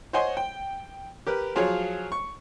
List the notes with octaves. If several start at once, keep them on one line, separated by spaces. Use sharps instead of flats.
C5 C#5 D#5 F#5 G#5 C6
G5
G4 A#4 B4
F3 F#3 F4 G#4 C#5
C#6